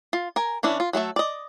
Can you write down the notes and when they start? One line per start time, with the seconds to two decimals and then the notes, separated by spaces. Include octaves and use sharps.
0.13 F4
0.36 A#4 G#5
0.63 E3 C#4 D4 E4
0.80 F4
0.93 F#3 A3 A4 E5
1.16 D5 D#5